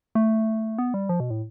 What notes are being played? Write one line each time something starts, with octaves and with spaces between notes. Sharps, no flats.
A3
B3
G3
F3
B2
A2